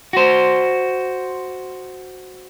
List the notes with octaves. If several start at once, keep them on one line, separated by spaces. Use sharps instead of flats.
F#4 C5